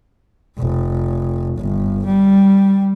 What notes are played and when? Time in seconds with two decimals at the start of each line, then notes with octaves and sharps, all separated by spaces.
0.58 F1
1.59 G1
2.05 G3